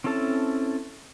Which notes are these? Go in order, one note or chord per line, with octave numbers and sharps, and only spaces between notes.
C4 C#4 E4 A4 A5